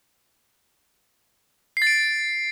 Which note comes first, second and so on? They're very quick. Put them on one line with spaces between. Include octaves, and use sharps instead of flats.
C7 A6 D7